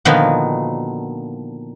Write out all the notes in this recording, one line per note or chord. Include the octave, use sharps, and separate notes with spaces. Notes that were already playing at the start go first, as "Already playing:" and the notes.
A#2 D3 D#3 F3 B3 F#4